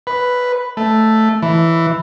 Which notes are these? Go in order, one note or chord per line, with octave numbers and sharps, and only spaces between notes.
B4
A3
E3